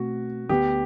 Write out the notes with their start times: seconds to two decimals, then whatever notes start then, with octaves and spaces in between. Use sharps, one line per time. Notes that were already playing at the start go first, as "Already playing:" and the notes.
Already playing: B2 A3 C4 F#4
0.49 D2 D3 G3 B3 G4